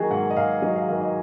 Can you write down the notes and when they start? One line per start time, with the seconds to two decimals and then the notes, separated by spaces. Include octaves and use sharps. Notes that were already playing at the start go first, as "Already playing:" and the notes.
Already playing: D#3 F#3 D#4 F#4 G#4
0.10 G#2 F#5
0.30 D#5
0.36 G#2 F5
0.62 F#3 D#5
0.76 F5
0.89 D#3 F5
1.01 D#5